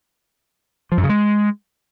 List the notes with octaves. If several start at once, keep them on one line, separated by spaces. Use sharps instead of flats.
F3
F#2
C#3
G#3